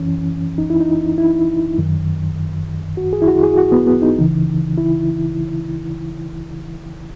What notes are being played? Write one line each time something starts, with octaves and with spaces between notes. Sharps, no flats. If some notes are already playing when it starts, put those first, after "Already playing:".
Already playing: F#2 E3 C#4
D#4
E4
D#4
E4
F#2 D#3
F#4
G#4
E4
F#4
G#4
F#4
B3
B3
D#4
C#2 C#3 E3
E4